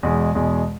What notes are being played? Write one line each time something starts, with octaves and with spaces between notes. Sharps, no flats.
E2 B2 G#3
E2 B2 G#3